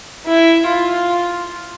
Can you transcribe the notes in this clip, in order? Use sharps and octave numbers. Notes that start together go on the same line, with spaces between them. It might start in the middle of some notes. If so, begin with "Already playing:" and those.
E4
F4